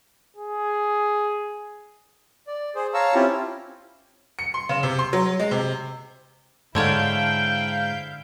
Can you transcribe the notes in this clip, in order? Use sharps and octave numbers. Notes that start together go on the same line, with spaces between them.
G#4
D5
G#4 C5
C#5 F5 A5 A#5 C#6 E6
C4 C#4 E4 F4 G4
C#7
C6
C#3
C3
C6
F#3
G#3
C3
G#2 D3 E4 C#5 F5 G5 A5 G6